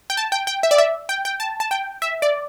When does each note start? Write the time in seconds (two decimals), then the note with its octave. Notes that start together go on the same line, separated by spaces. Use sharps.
0.10 G5
0.17 A5
0.32 G5
0.47 G5
0.63 E5
0.71 D5
0.78 E5
1.09 G5
1.25 G5
1.40 A5
1.60 A5
1.71 G5
2.02 E5
2.22 D5